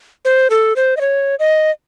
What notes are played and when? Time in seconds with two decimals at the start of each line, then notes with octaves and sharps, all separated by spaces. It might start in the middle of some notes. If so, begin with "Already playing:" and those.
0.25 C5
0.50 A4
0.76 C5
0.97 D#5
1.01 C#5
1.39 D#5